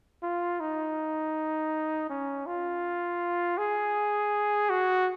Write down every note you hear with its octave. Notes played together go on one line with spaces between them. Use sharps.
F4
D#4
C#4
F4
G#4
F#4